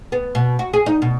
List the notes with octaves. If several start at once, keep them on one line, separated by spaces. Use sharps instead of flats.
B3
B2
F#4
G#4
D#4
B2